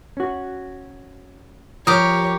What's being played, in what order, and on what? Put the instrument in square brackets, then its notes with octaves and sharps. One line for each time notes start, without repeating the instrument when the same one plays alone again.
[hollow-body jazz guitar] C#4 F#4
[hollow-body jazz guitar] F3 [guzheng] G4 A#4 [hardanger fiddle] C#5 [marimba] D#6